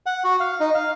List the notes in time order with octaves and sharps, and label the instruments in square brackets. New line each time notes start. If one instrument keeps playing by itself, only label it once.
[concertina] F#5
F#4
F5
D#4
F5